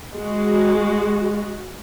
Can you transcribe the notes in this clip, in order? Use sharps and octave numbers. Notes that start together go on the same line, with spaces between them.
G#3 F#4